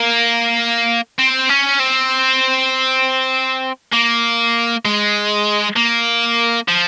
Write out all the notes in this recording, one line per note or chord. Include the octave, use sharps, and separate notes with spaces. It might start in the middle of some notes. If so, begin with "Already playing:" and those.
Already playing: A#3
C4
C#4
C4
A#3
G#3
A#3
F3